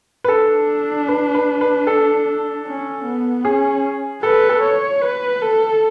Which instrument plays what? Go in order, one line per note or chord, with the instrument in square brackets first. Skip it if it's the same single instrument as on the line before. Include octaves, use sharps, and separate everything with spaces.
[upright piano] B4
[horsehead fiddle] D4 [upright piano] A4
[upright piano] B4
B4
B4
A4
[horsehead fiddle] C#4
B3
[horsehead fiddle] C#4 [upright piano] G#4
[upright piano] A4 [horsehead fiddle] B4
[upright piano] A4
[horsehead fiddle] C#5
B4
A4